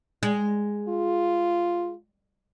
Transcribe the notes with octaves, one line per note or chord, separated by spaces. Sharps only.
G#3
F4